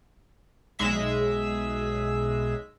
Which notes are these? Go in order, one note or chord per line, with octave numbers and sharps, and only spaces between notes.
B1 G#3 E5 B6